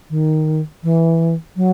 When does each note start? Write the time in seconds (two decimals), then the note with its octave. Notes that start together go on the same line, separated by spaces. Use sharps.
0.10 D#3
0.83 E3
1.56 F#3